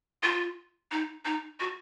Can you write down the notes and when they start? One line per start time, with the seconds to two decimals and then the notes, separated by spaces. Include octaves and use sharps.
0.23 F4
0.91 D#4
1.25 D#4
1.60 F#4